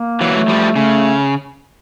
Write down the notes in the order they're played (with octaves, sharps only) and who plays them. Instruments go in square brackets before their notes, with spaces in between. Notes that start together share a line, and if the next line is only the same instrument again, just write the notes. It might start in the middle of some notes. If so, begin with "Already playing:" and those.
Already playing: [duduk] A#3
[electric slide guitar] E3 F#3
[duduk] A3
[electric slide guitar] F3 G3
[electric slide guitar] C#3 [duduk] A3